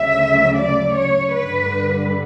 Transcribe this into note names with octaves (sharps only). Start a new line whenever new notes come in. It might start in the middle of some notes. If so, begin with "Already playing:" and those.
Already playing: D2 C#3 F#3 E5
D5
C#5
G2 D3 G3 B4